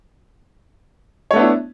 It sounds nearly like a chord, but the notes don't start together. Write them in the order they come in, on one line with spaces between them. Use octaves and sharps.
C#5 A3 B3 D4 E4